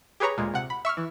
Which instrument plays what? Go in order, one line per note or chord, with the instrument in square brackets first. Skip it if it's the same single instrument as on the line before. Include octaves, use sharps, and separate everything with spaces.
[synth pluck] G4 G#4 B4 C#5 A#5
D2 A#2 G#3
C3 F#5
B5
E5 C#6 E6 F6
E3